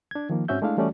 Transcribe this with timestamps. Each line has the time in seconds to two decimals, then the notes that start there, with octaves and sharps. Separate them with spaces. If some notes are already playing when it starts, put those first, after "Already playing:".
0.11 D4 G#6
0.30 D#3 F3 A#3
0.48 G#2 C4 C#4 F#4 E5 G6
0.62 G#3 A3 D4 E4 F5
0.77 E3 G3 A3 C#4 F#4 D5